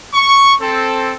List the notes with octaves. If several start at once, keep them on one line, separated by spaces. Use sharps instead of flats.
C#6
C4 A4